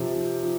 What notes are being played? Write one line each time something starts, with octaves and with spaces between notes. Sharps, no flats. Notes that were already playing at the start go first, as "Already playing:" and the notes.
Already playing: C3 F3
F3
F3